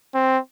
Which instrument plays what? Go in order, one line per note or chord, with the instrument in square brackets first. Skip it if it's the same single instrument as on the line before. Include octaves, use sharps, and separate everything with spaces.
[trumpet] C4